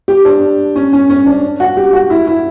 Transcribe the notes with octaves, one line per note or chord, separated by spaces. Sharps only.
G4
D4
C#4
C#4
C#4
D4
F#4
G4
F#4
E4
E4